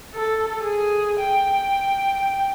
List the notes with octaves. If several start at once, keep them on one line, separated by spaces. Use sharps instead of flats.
A4
G#4
G5